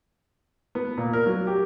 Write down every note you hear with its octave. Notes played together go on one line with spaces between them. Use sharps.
B3
A#2
A#4
F#3
G4